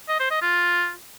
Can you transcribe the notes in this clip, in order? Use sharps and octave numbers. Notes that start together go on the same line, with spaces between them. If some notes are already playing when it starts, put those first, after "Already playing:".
D#5
C5
D#5
F4